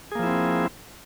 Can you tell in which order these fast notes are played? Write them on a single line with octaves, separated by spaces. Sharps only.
G#4 A#3 F3 E4 C4